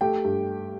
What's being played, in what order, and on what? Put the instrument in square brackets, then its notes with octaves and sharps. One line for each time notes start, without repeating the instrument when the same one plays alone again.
[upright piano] A3 [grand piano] G4 G5
[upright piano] G2